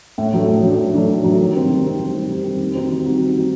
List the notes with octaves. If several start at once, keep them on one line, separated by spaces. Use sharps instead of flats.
A2
F#3 A3 D4
A2
F#3 A3 D4
A2
F#3 A3 D4
A2
F#3 A3 D4
D#3
G3 C4
D#3
G3 C4
D#3
G3 C4
D#3
G3 C4
D#3
G3 C4 D#4 F#4
D#3
G3 C4 D#4 F#4
D#3
G3 C4 D#4 F#4